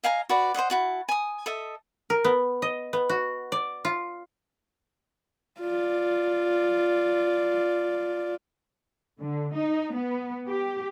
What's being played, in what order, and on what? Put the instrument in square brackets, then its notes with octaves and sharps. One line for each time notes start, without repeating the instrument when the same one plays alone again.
[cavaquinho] D#5 F5 G#5 A#5
F#4 B4 D5
C5 C#5 D#5 F#5
E4 F#4 A5
G#5 D#6
A4 D#5 E5
[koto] A#4
B3
D#5
B3
F#4
D5
F4
[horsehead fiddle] F4 D5
[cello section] D3
D#4
B3
G4